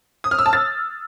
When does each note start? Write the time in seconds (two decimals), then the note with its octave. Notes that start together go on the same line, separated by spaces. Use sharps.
0.24 D#6
0.31 F6
0.39 E6
0.46 A5
0.53 A6